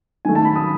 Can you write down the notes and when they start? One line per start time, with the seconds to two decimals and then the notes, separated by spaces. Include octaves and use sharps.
0.25 D#3 F#3 A3 G#5
0.35 A5
0.45 B5
0.56 D#6